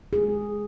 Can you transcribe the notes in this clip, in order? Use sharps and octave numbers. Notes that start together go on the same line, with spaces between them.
G#4